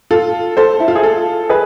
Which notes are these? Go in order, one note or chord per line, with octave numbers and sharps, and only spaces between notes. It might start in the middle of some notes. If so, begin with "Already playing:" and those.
F4 A4
A4 C5
E4
F4
G#4
F4 A4
G#4 B4